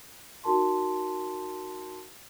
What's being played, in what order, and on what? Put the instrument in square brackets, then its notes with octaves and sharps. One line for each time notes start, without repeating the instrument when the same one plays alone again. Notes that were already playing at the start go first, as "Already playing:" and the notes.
[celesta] D#4 F#4 A#4 A5 C6